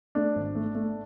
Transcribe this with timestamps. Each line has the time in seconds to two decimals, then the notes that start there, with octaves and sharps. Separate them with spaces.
0.15 A3 D4
0.35 G#1
0.55 A3
0.75 A3